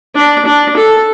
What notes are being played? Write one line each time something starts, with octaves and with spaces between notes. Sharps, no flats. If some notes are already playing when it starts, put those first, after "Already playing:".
D4
D4
A4